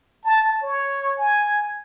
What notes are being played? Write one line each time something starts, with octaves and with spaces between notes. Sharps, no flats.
A5
C#5
G#5